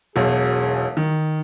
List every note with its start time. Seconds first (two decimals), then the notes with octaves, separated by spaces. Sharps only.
0.16 E1 B1 G#4
0.97 D#3